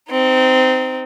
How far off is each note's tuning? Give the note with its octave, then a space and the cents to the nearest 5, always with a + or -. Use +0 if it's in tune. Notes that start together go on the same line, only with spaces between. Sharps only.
C4 -20 D#4 +0